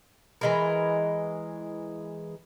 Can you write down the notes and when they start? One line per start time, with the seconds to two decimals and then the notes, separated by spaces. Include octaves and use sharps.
0.41 E3 G#3 A#4